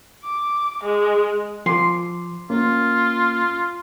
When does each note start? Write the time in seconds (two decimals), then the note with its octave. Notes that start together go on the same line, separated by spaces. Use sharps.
0.24 D6
0.83 G#3
1.66 F3 C6 D6
2.50 A#3 C#4 F4